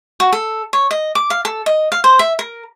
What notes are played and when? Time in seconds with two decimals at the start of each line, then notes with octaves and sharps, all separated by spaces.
0.20 F#4
0.33 A4
0.73 C#5
0.91 D#5
1.15 D6
1.30 F5
1.45 A4
1.66 D#5
1.92 F5
2.04 C5
2.19 E5
2.39 A#4